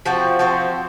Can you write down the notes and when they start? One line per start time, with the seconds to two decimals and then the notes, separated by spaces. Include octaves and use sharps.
0.06 F3 C4 F#4
0.39 F3 C4 F#4 C5